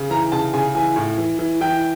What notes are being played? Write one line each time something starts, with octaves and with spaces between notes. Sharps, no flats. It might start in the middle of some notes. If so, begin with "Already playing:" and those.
Already playing: C#3
E3 A#5
C#3 A5
C#3 G#5
E3 G#5
A2
E3
E3
E3 G5